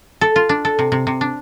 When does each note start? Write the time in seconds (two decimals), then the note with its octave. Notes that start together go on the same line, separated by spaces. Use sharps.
0.21 A4
0.36 F4
0.49 D4
0.65 A4
0.79 C3
0.92 C3
1.07 C3
1.21 D4